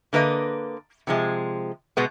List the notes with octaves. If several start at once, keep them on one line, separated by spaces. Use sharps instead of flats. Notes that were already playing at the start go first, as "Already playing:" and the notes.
D3 A#3 B4 D#5
C3 F3 G#3
B2 G#3 B3